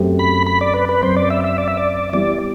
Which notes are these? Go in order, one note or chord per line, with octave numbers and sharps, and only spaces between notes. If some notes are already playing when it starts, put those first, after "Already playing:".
Already playing: F#2 F#3 A3 C4 G4
B5
B5
D5
B4
B4
F#2 F#3 C4 C5
D5
E5
E5
D5
E5
D5
E3 G3 B3 E4 D5